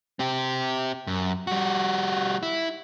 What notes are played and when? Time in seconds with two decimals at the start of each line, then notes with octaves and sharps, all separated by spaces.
0.19 C4 G4
1.07 F#2
1.47 G3 F#4
2.43 E4